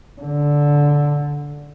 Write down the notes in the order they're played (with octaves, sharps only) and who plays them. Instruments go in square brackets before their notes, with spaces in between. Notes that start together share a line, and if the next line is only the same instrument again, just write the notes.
[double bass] D3